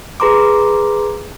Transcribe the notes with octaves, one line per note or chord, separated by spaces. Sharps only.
G#4 B4 A#5 C6 D6